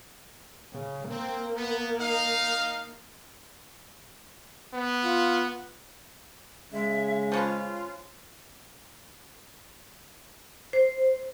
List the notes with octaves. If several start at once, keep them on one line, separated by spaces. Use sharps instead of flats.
C#3
A#3 C4
B3
D#4 F5
B3
F4
C#3 G#3 E5
F3 C#4 F4 B4
C5